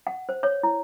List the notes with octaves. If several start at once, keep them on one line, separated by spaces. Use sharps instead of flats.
F#5
C5
C#5
E4